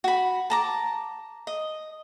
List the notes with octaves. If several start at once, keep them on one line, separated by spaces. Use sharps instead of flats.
F#4 B5
A5 A#5 D6
D#5